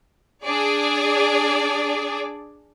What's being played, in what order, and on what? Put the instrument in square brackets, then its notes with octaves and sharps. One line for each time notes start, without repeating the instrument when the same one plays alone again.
[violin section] D4 G#4 D5